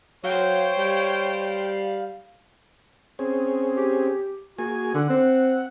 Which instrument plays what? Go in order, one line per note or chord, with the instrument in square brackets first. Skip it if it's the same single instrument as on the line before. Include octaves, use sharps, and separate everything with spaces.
[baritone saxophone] F#3 [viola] C5 G5 [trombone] C#5 [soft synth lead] F5
[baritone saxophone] G3
[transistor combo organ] C4 C#4 G#4
[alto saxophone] G4
[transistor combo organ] A#3 G#4 G#5 [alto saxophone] F#4
[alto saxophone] D3 [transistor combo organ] F#5
[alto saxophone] C4